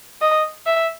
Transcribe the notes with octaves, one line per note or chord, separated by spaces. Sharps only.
D#5
E5